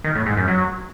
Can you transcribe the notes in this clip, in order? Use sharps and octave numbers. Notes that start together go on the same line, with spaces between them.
D#3
A2
G#2
F#2
F#3